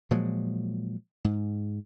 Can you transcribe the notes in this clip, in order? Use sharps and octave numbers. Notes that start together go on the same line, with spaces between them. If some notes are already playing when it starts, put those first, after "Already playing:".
A#2 F3 F#3 G#3
G#2